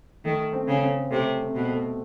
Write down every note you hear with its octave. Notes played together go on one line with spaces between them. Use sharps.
D#3 A3
C4
C#3
C4
C3 A3
C4
B2
A3